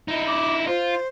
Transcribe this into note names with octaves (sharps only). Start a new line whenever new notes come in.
D#4 E4 D#5
D6
F4 C5